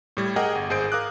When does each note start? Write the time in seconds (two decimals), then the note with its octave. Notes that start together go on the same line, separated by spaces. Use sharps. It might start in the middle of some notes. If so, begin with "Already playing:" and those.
0.17 A2 G3 G#6
0.36 G#4 A#4 D#5 F#5 G5 D6
0.55 G1
0.70 G#1 G#4 C5 G6 D7
0.92 A#4 F5 D6 D#6 F#6